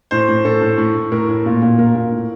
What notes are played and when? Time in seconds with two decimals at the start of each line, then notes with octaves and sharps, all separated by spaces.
0.11 A2 C5
0.28 A2
0.45 A2 A4
0.61 A2
0.78 A2
0.95 A2
1.12 A2 A#4
1.29 A2
1.46 A#2
1.62 A#2
1.78 A#2 A#4
1.95 A#2
2.12 A2